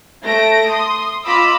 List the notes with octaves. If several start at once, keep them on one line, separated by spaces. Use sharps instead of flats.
A3 A#6 D7
C6 D#6
F4 D#5 B5 D6 E6